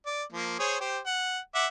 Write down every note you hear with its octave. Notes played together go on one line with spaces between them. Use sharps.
D5
F3 A#3
G#4 C5 C#5
G4 C5
F#5
E5 F#5 D6